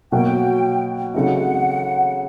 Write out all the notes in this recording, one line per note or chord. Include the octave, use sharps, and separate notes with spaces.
B2 F#3 A#3 G5
C#3 F#3 A3 C4 D#4 F#5